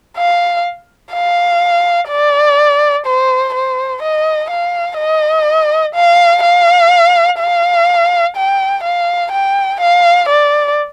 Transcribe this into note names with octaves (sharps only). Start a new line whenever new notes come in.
F5
F5
D5
C5
C5
D#5
F5
D#5
F5
F5
F5
G5
F5
G5
F5
D5